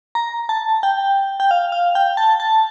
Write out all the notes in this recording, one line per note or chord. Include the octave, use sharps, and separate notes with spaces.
A#5
A5
G5
G5
F5
F5
G5
A5
A5